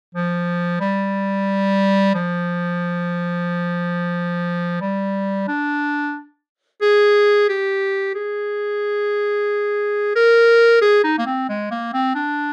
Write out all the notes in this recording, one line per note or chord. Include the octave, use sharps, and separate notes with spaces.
F3
G3
F3
G3
D4
G#4
G4
G#4
A#4
G#4
D#4
A#3
C4
G#3
A#3
C4
D4